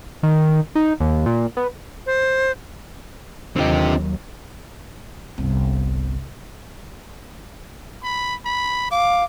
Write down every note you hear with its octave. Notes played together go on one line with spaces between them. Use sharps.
D#3
D#4
D#2
A#2
B3
C5
D#2 D3 F#3 C4 F4 G4 D#5
G1 C2
B5
B5
F5 D6